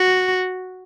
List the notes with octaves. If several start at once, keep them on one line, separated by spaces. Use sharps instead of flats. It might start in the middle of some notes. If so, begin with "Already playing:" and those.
Already playing: F#4